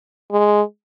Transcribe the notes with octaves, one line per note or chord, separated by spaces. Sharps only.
G#3